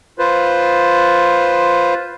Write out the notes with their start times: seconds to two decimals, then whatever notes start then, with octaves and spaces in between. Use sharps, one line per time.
0.19 F4 B4 C5